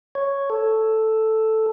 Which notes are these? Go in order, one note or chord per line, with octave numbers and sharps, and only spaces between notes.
C#5
A4